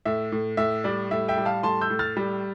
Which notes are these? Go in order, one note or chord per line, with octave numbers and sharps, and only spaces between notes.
A2 E5
A2
A2 E5
G3 D5
A2 E5
E5 G5
G3
F5 A5
A2 A5 C6
E6 G6
A2
F6 A6
G3